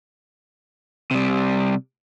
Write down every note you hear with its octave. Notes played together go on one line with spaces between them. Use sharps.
C3 G3